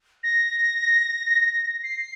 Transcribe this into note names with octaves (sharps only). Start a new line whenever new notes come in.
A#6
C7